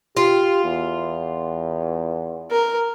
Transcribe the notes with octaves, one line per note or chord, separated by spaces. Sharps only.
F4 G4
E2
A#4